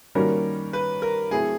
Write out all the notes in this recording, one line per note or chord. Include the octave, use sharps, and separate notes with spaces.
D#3 G3 A#3 C#4 F#4 A#4
B4
A#4
F#3 A3 C4 E4 G#4 A4